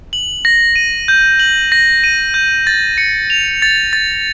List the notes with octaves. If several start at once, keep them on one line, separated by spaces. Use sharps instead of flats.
F#7
A#6
D#7
G6
F#7
A#6
D#7
G6
A6
C#7
F7
A6
A6